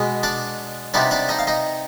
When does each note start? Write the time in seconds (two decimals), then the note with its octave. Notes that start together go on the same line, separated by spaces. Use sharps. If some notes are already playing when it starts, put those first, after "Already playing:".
Already playing: B2 G#3 B3
0.23 D4 D5
0.94 C3 G3 B3 D4 D#4 D5
1.11 D4 D5
1.29 D#4 D#5
1.39 F5
1.47 D#4 D#5